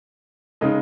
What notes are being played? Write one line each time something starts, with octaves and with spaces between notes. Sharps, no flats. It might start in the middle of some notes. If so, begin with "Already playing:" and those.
C#3 G#3 D#4 D#5